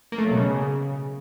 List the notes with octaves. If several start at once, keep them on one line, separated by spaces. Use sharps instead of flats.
A#3
A3
F#3
B2
C#3